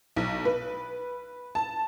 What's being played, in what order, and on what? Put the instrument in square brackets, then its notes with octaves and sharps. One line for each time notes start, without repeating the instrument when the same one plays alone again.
[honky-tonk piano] B1
B4
A5